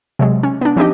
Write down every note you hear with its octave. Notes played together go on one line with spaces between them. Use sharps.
C3 F#3 G#3
C#4
B3 D4
F3 C4 D4 D#4 G4 D#5